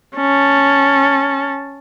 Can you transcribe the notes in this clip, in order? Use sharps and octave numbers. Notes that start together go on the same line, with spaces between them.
C#4 A5